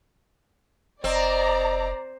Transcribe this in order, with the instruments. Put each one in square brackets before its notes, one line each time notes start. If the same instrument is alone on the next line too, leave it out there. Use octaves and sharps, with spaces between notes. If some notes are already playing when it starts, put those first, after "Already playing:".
[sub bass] F1 [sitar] C4 [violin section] D5 A#5 [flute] D#5